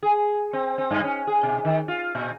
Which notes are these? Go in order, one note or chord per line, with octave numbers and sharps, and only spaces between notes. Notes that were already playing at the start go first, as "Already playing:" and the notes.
G#4
C4
C4
G2
C#4
G#4
B2
D#3
F4
A#2